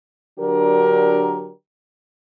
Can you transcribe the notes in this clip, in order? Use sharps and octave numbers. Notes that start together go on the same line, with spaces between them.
D3 F#3 D4 G4 A#4